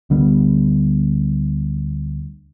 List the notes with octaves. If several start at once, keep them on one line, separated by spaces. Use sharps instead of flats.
D2 D3 G3 B3